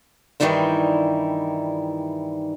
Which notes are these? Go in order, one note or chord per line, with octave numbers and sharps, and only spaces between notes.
G2 D#3 E3 G3 D#4 E4